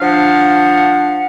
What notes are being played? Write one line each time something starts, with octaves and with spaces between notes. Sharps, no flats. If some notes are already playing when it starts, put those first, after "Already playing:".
F3 D4 F5 F#5